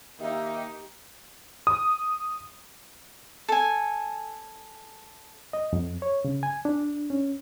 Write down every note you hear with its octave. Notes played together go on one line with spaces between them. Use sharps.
D#3 A#3 D#4 G4 E5
D#6
A4 G#5
D#5
F2
C#5
C#3
G#5
D4
C#4